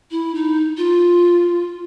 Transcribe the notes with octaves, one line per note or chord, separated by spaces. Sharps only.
E4
D#4
F4